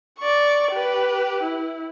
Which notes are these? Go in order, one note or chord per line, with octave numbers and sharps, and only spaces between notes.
D5 C#6
G4 B4
E4